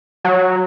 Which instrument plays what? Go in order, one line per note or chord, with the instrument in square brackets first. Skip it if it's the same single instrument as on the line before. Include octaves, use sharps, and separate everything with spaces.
[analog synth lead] F#3